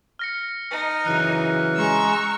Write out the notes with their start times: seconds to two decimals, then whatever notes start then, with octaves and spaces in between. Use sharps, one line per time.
0.19 F6 A#6 C#7
0.72 D#4
1.07 F#2 C#3 E3 F#6
1.77 G#3 A#5 C#6 E6